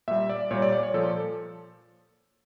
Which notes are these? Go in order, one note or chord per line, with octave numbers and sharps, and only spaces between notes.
A#2 G3 E5
D5
A#2 G3 C#5
D5
D5
C#5
A#2 F3 A4